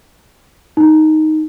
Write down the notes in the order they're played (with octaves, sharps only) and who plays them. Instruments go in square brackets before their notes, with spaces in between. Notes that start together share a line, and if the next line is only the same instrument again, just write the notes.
[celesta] D#4